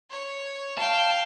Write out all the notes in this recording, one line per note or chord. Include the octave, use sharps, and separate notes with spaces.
C#5
F5 G5 A5